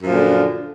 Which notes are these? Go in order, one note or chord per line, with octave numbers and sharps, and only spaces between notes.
F#2 A#2 D3 F3